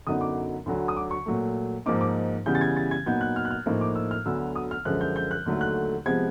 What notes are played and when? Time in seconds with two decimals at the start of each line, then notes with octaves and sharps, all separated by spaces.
0.07 F#2 D3 F#3 B3 D#4 D#6
0.21 D6
0.66 D2 D3 F#3
0.88 D#6
0.96 D6
1.11 C#6
1.26 A#2 F#3 A3
1.86 G#2 F3 A#3 D#4 D6
2.01 D6
2.46 C#3 E3 G3 B3 G6
2.55 A6
2.61 G#6
2.76 A6
2.91 G#6
3.06 A#2 F#3 B3 D#4 G6
3.21 F#6
3.36 F6
3.45 F#6
3.51 F6
3.66 A2 F3 A#3 D#4
3.81 D6
3.96 E6
4.11 F6
4.26 D2 D3 F#3 B3 E6
4.56 D#6
4.71 F6
4.85 F#2 D3 F3 G#3 F#6
5.01 G6
5.16 G6
5.31 F#6
5.46 D#2 D3 F#3 A3
5.61 F#6
6.06 C3 F3 G#3 B3 G#6